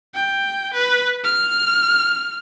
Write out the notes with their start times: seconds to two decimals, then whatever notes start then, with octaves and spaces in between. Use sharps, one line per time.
0.15 G5
0.74 B4
1.24 F6